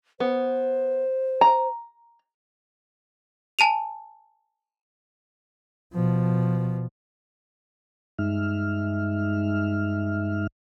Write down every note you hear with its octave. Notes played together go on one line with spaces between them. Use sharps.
B3 C5
A#5
G#5 A5 D#7 F7
B2 F3
G2 G#3 D#4 E5 F6